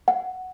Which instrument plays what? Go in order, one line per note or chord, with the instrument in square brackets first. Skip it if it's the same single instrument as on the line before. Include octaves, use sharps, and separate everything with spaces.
[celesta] F#5